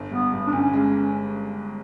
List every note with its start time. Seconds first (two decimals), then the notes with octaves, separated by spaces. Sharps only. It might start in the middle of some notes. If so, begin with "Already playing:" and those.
Already playing: G1
0.11 G2 B3
0.32 G2
0.47 D4
0.52 G1 C#4
0.73 G#3